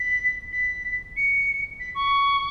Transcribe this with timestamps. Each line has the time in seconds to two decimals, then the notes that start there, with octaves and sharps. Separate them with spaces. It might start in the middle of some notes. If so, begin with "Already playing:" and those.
Already playing: B6
0.52 B6
1.16 C#7
1.79 B6
1.94 C#6